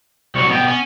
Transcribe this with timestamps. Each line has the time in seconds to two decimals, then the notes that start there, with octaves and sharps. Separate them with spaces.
0.35 C2 F#3 C#6
0.50 B2 B3 G4
0.68 C#4